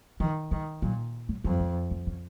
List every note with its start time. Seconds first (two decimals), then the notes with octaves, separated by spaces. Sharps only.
0.20 D#3 F3
0.51 D#3 G#3
0.82 A#2 F#3
1.29 F#3
1.44 F2 F#3
1.60 G#3
1.91 F3
2.07 C#3